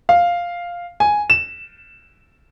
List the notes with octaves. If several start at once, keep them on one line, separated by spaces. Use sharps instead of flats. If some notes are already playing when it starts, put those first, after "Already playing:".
F5
G#5
E7